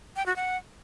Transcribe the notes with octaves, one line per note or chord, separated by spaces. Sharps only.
G5
F#4
F#5